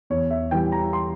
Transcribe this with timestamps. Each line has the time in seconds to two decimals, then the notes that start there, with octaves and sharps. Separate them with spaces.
0.10 E2 C#5
0.31 E5
0.51 E3 G3 G5
0.72 A#5
0.93 C6